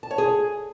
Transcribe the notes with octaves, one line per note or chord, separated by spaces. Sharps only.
A5
C#5
G#4